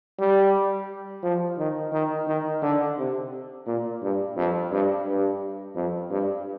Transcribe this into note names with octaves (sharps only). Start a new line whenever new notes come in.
G3
F3
D#3
D#3
D#3
D3
C3
A#2
G2
F2
G2
G2
F2
G2